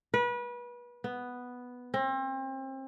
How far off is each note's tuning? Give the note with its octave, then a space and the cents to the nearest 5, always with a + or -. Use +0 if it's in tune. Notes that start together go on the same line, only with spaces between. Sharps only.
B4 -30
B3 +0
C4 +35